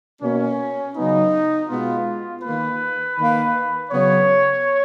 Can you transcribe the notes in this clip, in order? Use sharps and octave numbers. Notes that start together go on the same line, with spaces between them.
B2 A#3 C#4
C#3 F#3 B3 D#4
B2 G#3 B3 F4
D#3 A#3 B4
D#3 A#3
C#3 F#3 B3 C#5